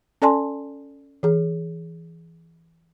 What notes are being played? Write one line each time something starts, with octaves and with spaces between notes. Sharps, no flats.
C#4 A4 D5 G#5 A5 C6
E3 G#4